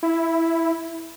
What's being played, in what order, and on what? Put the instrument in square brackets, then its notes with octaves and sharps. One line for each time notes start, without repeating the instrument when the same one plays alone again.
[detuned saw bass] E4